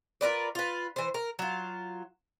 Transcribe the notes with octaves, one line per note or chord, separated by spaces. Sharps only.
F4 A#4 B4 D5
F4 B4
E3 C5
A#4
F#3 F4